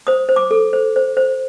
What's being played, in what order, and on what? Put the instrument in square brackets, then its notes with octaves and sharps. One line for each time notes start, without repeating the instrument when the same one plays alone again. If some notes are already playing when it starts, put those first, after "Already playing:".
[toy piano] C5 D#6
C5
D6
A4
C5
C5
C5